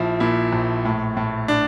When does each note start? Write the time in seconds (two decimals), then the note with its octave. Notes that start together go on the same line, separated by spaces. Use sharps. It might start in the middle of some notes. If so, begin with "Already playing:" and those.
Already playing: A#1 F3 E4
0.20 A#2 E4
0.53 A#1
0.85 A2
1.17 A2
1.48 D4